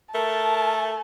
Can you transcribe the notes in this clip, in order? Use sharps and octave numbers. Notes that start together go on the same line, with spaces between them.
A3 A#4 A5